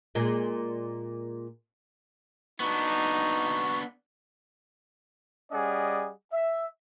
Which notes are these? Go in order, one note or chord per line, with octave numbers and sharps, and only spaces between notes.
A#2 G#3
B3 D4 D#4 F#4
G3 C#4 G#4 D5 D#5 F#5
E5